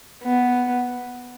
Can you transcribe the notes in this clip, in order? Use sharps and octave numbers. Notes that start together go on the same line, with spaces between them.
B3